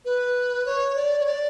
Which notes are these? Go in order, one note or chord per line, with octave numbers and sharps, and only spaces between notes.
B4
C#5
D5
C#5
D5